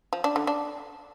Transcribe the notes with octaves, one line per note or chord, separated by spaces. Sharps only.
F3
D4
D3
D4